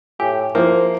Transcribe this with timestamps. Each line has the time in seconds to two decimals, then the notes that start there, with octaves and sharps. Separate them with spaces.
0.20 A2 G4 G#5
0.55 F3 A#3 E4 G#4 C5 E5